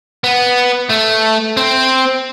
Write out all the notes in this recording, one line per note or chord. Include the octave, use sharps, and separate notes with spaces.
B3
A3
C4